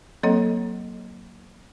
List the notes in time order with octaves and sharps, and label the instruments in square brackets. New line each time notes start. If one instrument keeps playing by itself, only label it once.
[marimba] F#3 A#3 C4 A4 C#5 D#5